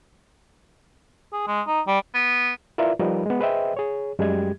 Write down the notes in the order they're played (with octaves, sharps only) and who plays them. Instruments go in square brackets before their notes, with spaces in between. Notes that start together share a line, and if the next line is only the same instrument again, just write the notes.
[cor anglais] G#4
G#3
D#4
G3
[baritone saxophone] B3
[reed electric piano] E4 F4 A#4 B4 D5 E5
F3 G3 D#4 A#4 B4
G#3 B3
G#4 B4 C5 D#5 E5 G5
G#4 C#5
F#2 G3 G#3 G4 G#6